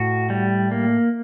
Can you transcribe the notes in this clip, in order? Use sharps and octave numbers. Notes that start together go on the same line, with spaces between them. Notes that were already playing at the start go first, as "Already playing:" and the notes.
Already playing: A2 F#4
G3
A#3